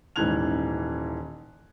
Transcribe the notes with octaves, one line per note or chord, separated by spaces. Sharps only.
D#1 G#2 E3 F#6 G#6 F7